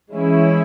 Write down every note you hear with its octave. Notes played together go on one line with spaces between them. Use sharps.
E3 G#3 C#4 E4